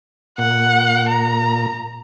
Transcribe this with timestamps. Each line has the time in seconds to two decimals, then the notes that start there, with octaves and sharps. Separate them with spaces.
0.38 A#2 F#5
1.09 A#5